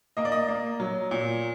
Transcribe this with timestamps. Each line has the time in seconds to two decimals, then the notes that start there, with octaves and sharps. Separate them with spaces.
0.17 A#3 D#5
0.25 D5
0.32 D#5
0.48 A#3
0.80 F#3
1.11 A#2